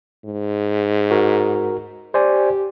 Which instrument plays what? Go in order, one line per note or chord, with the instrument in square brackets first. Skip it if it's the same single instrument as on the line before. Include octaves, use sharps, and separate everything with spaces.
[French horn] G#2
[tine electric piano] F#4 A#4
[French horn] G4 [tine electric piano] C5 D5 G#5